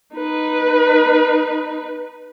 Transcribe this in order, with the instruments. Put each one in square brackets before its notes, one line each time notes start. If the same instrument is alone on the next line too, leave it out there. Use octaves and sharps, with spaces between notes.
[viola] D#4 B4